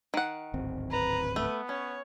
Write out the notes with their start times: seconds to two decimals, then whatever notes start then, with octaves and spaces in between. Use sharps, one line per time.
0.14 D#3 F#5
0.54 D1 G#1 C4
0.92 B4 A#5
1.36 A3 B3
1.69 C#4 C#5